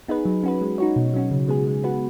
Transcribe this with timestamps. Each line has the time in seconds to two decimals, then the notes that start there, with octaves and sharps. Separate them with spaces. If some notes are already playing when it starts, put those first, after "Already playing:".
0.08 B3 D#4 G#4 B4
0.25 F#3
0.43 C#4 F#4 B4
0.61 G#3
0.78 D#4 F#4 C#5
0.96 B2
1.14 F#3 C#4 F#4
1.31 C#3
1.48 G#3 B3 G#4
1.67 G#3
1.84 B3 F#4 B4